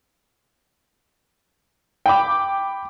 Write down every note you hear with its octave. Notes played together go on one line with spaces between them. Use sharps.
G5 B5 D6